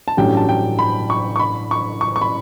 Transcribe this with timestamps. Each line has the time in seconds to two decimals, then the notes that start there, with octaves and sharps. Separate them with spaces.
0.08 A5
0.17 A1 G2 F#3 C#4 G4 G5
0.37 A5
0.49 G5
0.79 B5
1.10 C#6
1.36 C#6
1.40 B5
1.71 C#6
2.01 C#6
2.16 C#6
2.21 B5